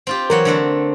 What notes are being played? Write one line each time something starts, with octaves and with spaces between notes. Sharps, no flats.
C4 F4 G4
E3 F#3 A#4 C#5
D3 A3 C4